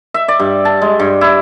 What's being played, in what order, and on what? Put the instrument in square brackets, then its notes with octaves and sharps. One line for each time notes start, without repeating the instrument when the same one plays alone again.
[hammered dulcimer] E5
D5
G2
A5
G#3
G2
E4